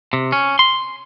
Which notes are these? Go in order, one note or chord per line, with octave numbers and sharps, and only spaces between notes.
C3
C#4
C6